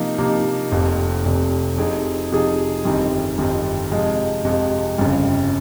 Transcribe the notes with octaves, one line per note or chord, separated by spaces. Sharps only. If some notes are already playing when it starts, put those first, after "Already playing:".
Already playing: C3 F3 A#3 D#4
C3 F3 A#3 D#4
F1 F2 C3
F1 F2 C3
C3 F3 C4 D#4 G#4
C3 F3 C4 D#4 G#4
G1 F2 D#3 G3 C4
G1 F2 D#3 G3 C4
F2 C3 F3 G#3
F2 C3 F3 G#3
G1 F2 C#3